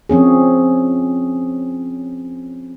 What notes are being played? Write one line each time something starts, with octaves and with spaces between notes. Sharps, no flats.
F3 C4 C#4 G#4